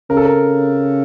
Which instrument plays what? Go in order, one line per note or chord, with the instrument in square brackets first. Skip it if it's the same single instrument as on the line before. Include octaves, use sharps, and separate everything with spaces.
[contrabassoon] C#3 [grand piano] A#4
[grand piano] A4
A#4